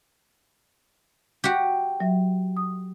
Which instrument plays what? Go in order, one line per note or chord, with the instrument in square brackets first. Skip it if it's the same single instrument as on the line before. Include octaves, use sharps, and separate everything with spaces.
[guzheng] F#4 G4
[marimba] F#3 E5
D#6